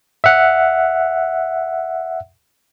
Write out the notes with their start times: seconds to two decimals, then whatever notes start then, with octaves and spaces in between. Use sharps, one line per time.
0.24 E5 F#5